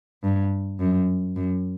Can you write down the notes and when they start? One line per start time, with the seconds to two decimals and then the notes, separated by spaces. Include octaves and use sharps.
0.24 G2
0.80 F#2
1.36 F#2